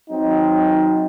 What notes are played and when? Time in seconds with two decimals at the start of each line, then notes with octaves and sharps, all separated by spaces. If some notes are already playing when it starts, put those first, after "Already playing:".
0.10 F#3 C4 D#4